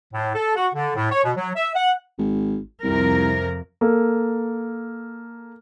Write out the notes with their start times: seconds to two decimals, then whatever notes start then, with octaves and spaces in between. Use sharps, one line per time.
0.14 A2
0.35 A4
0.56 F#4
0.75 D3
0.95 A2
1.11 C#5
1.24 B2
1.37 F#3
1.56 E5
1.75 F#5
2.18 G#1
2.83 C2 F2 C3 A#4
3.81 A#3 A4